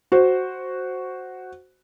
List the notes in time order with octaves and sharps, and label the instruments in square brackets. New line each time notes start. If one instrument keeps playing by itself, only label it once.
[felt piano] F#4 C5